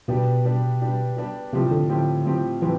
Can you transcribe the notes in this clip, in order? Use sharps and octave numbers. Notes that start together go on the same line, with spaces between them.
B2 G3 B3 D4 G4
G3 B3 D4 G4
G3 B3 D4 G4
G3 B3 D4 G4
A2 C3 F3 C4 G4
D3
A2 F3 C4 G4
A2 F3 C4 G4
A2 E3 F3 C4 G4